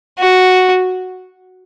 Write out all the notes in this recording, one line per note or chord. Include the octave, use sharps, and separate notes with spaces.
F#4